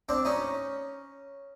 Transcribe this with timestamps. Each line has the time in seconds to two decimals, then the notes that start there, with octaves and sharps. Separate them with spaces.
0.09 C4 D4
0.25 C#4 D#4